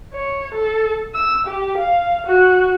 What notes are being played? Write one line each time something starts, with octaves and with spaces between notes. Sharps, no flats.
C#5
A4
E6
G4
F5
F#4